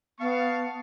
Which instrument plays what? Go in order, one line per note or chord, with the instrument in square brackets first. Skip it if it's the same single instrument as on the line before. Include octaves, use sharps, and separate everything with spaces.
[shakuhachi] B3 [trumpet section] F5 A5 C#6